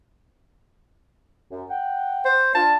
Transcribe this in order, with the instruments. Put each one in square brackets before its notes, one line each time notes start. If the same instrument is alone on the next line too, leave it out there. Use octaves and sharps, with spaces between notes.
[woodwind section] F#2
F#5 G5
[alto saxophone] C5
[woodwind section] D4 F4 [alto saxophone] A5